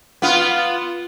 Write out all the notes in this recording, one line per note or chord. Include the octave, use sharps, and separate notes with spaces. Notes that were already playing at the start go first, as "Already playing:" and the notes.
B3 F4